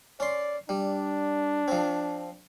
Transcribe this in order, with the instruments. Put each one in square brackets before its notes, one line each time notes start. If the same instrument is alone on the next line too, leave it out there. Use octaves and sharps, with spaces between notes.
[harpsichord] C#4 C6 [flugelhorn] D5
[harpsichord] G3 [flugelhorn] D4
[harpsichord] F3 C4